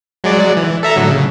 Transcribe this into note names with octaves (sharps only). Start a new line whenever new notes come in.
F#3 G#3 D5
E3
A4 E5 A#5
A2 D3 F#3
C#3